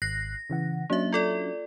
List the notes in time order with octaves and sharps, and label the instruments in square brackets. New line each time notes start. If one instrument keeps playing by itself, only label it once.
[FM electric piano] G#1 F#6 C7 [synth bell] A#6
[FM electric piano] C#3 E3 F#5
[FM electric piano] F#3 C#4 D4 [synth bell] A#3 E5
[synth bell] F4 A4 D5